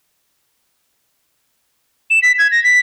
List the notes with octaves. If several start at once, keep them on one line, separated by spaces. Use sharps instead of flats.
E7
B6
G#6
A#6
B6